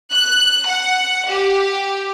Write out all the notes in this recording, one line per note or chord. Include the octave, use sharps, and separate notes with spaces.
F#6
F#5
G4